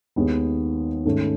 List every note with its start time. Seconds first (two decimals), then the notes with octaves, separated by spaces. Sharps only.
0.16 D#2 D#3 G#3 B3
1.05 G#2 D#3 A3 C#4